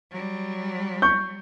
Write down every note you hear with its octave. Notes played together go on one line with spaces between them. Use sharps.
F#3 G3
C#6 G6